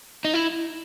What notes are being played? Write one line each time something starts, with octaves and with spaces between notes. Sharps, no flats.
D#4
E4